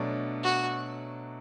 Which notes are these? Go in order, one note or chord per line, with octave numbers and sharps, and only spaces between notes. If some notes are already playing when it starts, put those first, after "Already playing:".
Already playing: B2 F#3 A3 D4
F#4